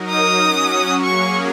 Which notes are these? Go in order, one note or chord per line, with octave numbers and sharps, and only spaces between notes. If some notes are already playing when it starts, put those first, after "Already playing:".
Already playing: F#3 D#4 A#4
D#6
F#3 C#4 F#4
F#3 A#3 C#4 G#4 C#6